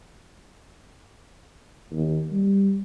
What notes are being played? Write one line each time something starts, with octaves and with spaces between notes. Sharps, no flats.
D#2
G3